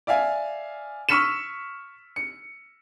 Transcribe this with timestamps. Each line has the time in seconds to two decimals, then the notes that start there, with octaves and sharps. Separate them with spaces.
0.07 D5 E5 F5 G#5
1.09 C#6 E6 F6 B6 C#7 E7
2.16 C#7